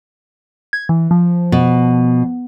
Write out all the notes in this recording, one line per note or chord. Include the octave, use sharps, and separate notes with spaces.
G#6
E3
F3
B2